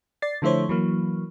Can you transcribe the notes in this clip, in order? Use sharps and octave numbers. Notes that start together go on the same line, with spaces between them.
D5 A6 C7
D3 F3 A3 E4 C5 C#5
E3 F#3 A#3